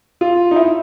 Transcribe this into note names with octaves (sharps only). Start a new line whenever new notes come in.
F4
D#4
E4